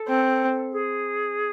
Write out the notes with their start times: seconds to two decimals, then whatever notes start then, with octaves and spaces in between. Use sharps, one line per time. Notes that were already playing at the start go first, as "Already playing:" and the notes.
Already playing: A4
0.08 C4
0.72 G#4